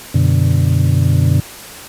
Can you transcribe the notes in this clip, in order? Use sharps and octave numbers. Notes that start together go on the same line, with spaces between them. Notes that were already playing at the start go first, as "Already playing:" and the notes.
F#2 B2 D3